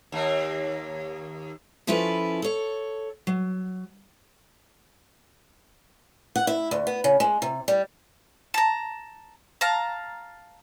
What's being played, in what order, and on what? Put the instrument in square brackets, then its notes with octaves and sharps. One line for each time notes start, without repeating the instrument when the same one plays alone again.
[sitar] D#2 A#3
[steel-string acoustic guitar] F3 C#4 E4 F4 A4 B4
A4 C#5
F#3
F#5
E4
D2
B3
C#3
G#3
C3
G3
[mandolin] A5 A#5
F5 A5 A#5